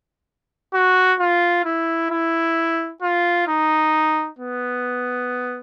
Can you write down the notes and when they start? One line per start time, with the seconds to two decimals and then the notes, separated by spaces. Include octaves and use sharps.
0.74 F#4
1.20 F4
1.65 E4
2.11 E4
3.02 F4
3.48 D#4
4.39 B3